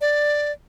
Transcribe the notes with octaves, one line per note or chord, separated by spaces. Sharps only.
D5